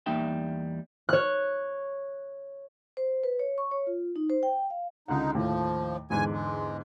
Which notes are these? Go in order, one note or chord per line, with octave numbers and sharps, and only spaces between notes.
E2 G3 A#3 D#4 E5 G5
C#5 F#6
C5
B4
C#5
C#6
C#5
F4
D#4
C5
G5
F5
C#2 D3 D#4 F#5
D#2 A2 F3 A3
E2 G#2 D3 G#5
G#3